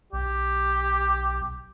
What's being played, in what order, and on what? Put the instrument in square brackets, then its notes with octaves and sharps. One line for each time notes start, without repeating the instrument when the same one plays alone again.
[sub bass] B1 [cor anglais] G4